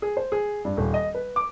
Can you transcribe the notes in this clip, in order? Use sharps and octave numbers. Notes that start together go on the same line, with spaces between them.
G#4
C5
G#4
G2
D#1
D#5
B4
D6